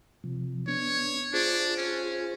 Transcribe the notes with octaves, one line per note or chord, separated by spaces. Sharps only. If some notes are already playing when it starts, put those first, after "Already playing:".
C3 F3
B3 D4 C#5
D4 F4 G#4 C5
C#4